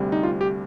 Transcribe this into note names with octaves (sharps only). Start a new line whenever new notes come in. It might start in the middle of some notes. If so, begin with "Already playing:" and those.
Already playing: D2 C3 G3
D#4
F4
G4